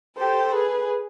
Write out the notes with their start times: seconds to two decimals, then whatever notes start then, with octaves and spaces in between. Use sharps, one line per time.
0.17 G4 A4 C5
0.52 G#4 B4